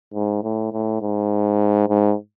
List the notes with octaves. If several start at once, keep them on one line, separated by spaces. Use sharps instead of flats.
G#2
A2
A2
G#2
G#2